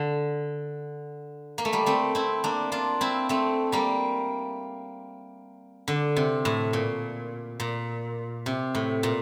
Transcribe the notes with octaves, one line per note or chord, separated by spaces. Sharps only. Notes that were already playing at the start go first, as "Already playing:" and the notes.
Already playing: D3
A#3
A3
G3 A#3
A3 C4
C4 E4
A#3 D4
D4 F4
C4 E4
A3 C4
G3 A#3
D3
C3
A2
A#2
A#2
C3
A2
A#2